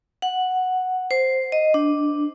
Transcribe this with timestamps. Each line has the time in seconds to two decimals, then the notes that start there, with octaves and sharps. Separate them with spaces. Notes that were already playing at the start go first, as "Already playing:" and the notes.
0.22 F#5
1.11 C5
1.52 D#5
1.74 D4